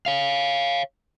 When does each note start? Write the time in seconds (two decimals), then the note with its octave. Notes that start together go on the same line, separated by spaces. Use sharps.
0.06 C#5 F5